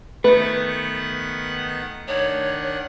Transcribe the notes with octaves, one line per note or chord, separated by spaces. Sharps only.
D#3 A3 B3 B4 F#5
D#3 D4 C#5 F#5